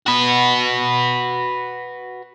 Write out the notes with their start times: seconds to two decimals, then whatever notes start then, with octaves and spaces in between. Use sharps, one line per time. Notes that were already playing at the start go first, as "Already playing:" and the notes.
0.06 F#4 B4